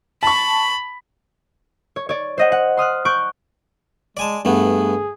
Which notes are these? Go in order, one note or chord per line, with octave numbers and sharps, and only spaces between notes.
A5 B5 C#6
C#5
C#5 D5
C5 D#5 F#5
F#5
C6 D#6 F6 F#6
C#6 F#6 G6 D7
G#3 D5 G#5 A5
G2 A3 B3 G#4